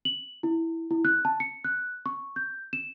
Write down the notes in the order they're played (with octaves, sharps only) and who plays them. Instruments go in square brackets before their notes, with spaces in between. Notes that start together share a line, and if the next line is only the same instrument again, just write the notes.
[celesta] F#7
E4
E4
F#6
A5
C#7
F#6
C#6
G6
E7